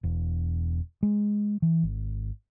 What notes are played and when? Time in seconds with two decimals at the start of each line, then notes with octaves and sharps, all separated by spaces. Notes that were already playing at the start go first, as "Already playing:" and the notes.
0.03 E1
1.03 G#3
1.62 E3
1.83 G#1